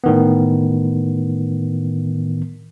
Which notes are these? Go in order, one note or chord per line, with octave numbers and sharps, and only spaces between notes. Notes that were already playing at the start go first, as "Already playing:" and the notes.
A2 D#3 B3